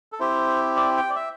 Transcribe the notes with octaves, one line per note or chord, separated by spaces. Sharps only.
A4
C4 E4 G4 C5
D5
G5
D5
E5